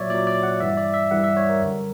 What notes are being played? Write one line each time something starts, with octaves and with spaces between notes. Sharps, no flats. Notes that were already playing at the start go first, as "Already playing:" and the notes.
Already playing: A#2 F#3 C#5 D5 E5
A#2 F#3 D5
D5
F#5
G2 E3 G3 E5
D5
E5
G2 E3 G3 F#5
E5
C#5
A#4
F#2 D3 G3